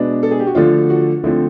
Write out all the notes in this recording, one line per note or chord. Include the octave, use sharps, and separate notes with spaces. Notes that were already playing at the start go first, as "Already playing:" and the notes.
Already playing: B2 G#3 B3 D4
A4
G#4
G4
F#4
D3 F3 A3 D4 F4
F#4
D3 F3 A3 C4 E4